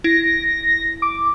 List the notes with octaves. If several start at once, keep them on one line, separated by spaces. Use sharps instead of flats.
E4 A#6
D6